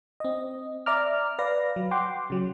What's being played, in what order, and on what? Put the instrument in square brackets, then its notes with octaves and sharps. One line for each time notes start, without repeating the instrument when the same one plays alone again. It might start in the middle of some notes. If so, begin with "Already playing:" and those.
[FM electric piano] C4 D#5
D5 E5 A#5 D6 F6
B4 D5 F5 A#6
F#3
F#5 G5 C6 D6
C#3 F#3